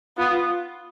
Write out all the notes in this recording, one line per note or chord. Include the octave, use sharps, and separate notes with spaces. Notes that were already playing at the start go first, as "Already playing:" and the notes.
B3 F4